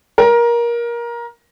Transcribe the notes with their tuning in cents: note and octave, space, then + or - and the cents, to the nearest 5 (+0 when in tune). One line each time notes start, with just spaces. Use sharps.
A#4 +20